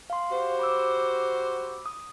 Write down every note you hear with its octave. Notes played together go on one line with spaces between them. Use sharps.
F5 C6
F#4 G4 C5
B5 D6 E6
D#6